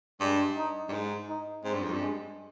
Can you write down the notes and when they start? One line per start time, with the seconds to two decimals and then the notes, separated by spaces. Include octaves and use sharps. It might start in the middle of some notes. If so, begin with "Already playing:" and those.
0.20 G2 G#3
0.57 D#4
0.89 G2
0.92 G#2 D#4
1.28 D#4
1.64 G#2 C4
1.74 G2
1.83 F2
1.93 G2
2.00 G#3